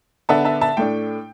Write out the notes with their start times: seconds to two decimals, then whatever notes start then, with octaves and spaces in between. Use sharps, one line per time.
0.29 D3 B3 D4 E5 A5
0.45 E5 A5
0.61 E5 A5
0.77 A2 A3 D4 G5